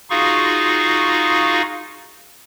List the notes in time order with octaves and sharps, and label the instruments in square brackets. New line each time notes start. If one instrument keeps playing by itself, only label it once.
[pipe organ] D#4 F4 F#4 G#4 F5 C#6